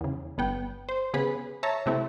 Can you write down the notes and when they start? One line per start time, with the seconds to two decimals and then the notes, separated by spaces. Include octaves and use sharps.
0.01 E2 C#3
0.38 G1 B3 G5
0.89 C5
1.14 C#3 B3 G#4 B4 B5
1.63 C#5 E5 A5 A#5
1.86 C3 A3 C4 E4